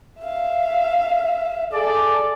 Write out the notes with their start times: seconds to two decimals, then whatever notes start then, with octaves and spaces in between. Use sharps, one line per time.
0.19 E5 F5
1.72 G#4 A4 D5